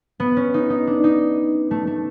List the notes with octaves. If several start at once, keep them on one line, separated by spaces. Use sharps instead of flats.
B3
C#4
D#4
D#4
D4
D#4
A3
A3